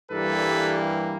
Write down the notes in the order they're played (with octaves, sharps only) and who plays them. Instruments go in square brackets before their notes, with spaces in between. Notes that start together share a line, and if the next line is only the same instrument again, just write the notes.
[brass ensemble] G2 E3 G3 A#3 A4 B4